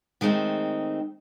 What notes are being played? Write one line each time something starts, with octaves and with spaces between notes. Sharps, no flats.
D#3 G#3 A3 C4 D#4